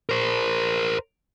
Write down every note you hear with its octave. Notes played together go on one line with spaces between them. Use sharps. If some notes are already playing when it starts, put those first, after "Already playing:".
A#4 C5